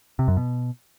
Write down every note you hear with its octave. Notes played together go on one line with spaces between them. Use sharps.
C3
F#2
B2